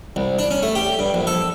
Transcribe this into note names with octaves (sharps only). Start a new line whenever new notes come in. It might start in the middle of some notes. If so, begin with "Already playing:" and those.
C2
D4
C#4
A3
G4
G2
A#1
A4